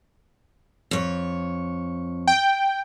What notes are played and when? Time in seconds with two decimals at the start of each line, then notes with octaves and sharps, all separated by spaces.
0.91 F2 C#5
2.28 G5